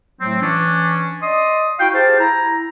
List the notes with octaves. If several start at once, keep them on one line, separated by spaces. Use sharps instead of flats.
A2 F#3 A3 C4
E3 C#4 D4
D5 D#5 C6 D#6
E4 F#4 F5 G5
G4 G#4 C5 F5 G5 A5
E4 A#5